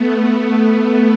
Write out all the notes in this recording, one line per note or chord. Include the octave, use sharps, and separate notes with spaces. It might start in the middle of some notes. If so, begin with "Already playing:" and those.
Already playing: A3 B3